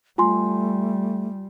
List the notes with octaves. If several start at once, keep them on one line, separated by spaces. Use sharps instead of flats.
G3 A3 F4 G#5 C6